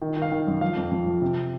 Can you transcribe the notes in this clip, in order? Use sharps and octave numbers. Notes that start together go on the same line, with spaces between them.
D#3
D#3
F5
D#3
F#2
F3 F5
F2
F2
F3
C3